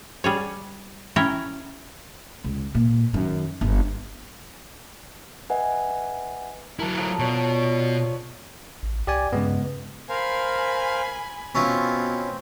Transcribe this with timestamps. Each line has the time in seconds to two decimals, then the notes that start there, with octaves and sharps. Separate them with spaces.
0.24 G3 G#4 C#5
1.16 C#4 E4 C#5 G5 A#5
2.44 C#2
2.75 A#2
3.13 F#2 D#3
3.61 G1
5.50 B4 D#5 E5 F#5 G#5
6.80 F#3 E4 A#4 A5
6.97 F3 F4 A4
7.19 B2 C#5 D5
8.83 A1
9.07 C2 G4 D5 G#5
9.33 G2 C#3 G#3 B3
10.09 A#4 C5 F5 G#5 B5
11.55 B2 C4 C#4 E4 F4